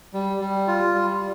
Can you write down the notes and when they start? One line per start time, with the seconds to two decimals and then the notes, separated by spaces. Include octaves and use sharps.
0.13 G3
0.41 G3
0.68 F4
0.94 G3